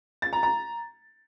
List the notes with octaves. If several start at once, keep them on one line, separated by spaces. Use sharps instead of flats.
A6
A#5
A#5